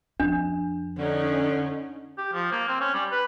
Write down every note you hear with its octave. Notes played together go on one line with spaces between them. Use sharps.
F2 D4
D3 C#4 D#4
G4
F3
A#3
C4
C#4
G3
B4